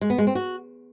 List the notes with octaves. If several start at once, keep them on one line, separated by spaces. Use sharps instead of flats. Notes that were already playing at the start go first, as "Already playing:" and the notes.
G#3
B3
G#3
C4
F#4